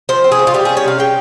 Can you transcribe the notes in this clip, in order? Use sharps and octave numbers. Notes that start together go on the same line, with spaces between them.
F3 C5
C4
G#4
C#3
F4
G3 G4
C#4 G#4
C#5
C3 F5
G#3 G5